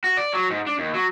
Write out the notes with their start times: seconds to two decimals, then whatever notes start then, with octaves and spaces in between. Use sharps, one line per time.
0.04 F#4
0.17 D5
0.34 F#3
0.50 G#2
0.67 D4
0.79 D#2
0.94 F#3